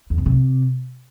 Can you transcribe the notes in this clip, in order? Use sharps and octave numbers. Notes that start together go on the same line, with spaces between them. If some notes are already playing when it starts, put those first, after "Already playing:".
E2
B2
C3